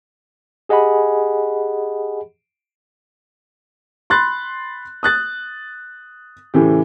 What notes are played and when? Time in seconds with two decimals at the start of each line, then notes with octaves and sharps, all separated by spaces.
0.69 G4 G#4 D#5 F#5 G#5 B5
4.10 B5 C6 F#6 A6
5.03 D#6 F#6 A6
6.54 A2 C#3 E3 G4